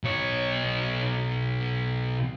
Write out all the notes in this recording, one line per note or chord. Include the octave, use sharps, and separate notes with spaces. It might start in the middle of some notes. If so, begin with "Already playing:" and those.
B1 C#5